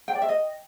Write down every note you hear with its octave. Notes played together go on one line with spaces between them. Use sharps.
G5
D5
E5
D#5